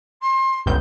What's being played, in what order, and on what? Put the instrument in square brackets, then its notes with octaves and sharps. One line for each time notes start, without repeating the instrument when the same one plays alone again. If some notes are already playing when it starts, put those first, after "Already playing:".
[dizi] C6
[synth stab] G1 C#2 G6